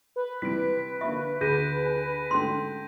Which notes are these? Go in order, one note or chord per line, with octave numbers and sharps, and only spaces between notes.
B4
C3 G3 E4 B6 D7
D3 A#3 E5 C#6
D2 G#4 G6 A#6 D#7
D4
G#2 D3 A3 C#4 C6